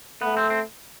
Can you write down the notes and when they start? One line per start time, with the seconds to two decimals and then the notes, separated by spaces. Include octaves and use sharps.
0.21 A3 B3
0.37 C4
0.50 C4